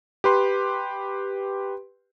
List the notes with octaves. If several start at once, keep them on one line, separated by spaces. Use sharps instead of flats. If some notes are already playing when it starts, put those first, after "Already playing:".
G4 B4 C6